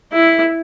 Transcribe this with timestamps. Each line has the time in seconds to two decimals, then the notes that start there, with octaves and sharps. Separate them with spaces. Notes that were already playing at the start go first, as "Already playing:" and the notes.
0.13 E4